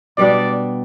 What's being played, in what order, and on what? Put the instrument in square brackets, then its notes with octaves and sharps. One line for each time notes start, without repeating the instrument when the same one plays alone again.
[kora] B2 G3 D4 [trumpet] D5